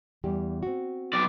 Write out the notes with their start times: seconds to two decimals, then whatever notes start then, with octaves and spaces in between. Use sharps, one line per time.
0.24 E2 G3 G4
0.63 C4 F#4
1.13 B1 D5